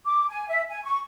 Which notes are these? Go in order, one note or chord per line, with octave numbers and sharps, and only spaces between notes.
D6
G#5
E5
G#5
C#6